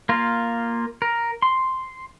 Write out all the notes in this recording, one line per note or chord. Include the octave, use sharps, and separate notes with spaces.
A#3 F4
A#4
C6